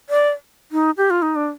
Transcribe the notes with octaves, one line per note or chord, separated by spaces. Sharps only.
D5
D#4
G4
F4
D#4
D4